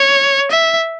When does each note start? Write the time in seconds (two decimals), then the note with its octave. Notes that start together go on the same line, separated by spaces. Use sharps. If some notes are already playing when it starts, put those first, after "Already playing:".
Already playing: C#5
0.51 E5